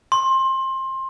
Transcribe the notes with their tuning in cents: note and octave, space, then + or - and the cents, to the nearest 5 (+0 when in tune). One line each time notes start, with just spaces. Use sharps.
C6 +20